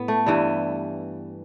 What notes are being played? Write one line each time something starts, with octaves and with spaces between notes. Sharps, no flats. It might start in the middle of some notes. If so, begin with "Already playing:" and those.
Already playing: A2 B3
A3
G2 E3 G3